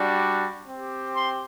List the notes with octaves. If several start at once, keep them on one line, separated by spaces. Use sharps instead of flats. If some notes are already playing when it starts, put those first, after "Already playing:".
Already playing: G3 D4 F#4
C4 G4
C6